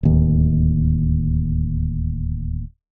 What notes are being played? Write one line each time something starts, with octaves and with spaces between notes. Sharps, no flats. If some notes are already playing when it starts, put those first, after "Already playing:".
D1 D#2